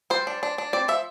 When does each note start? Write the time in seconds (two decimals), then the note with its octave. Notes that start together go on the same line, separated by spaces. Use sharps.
0.10 G3 C5
0.27 D4
0.43 D4
0.58 D4
0.73 C4 D5
0.88 F3 E5